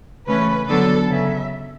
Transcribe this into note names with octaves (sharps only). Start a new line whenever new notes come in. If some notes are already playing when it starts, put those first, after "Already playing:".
C#3 E3 A3 C#4 B4
D3 F#3 B3 D4 A4
C#3 F#3 B3 E5